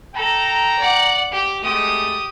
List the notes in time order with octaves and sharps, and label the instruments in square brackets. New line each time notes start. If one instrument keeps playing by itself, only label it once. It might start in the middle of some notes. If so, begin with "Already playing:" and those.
[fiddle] A4 [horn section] G5 A#5
[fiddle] D5 F#5
G4
[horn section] G#3 A3 [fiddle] G4 D#6